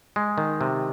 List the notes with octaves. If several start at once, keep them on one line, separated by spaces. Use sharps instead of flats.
G#3
D#3
C3